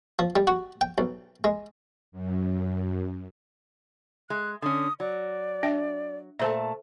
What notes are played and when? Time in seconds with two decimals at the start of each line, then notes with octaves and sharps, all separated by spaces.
0.19 F3
0.36 G3
0.47 F#4
0.81 G5
0.98 B1
1.44 G#3
2.12 F#2
4.30 G#3 F#6
4.62 D3 C#4 D#6
5.00 F#3 D5
5.63 D4 E5 G5
6.39 A#2 A3 A4 C5 E5 A5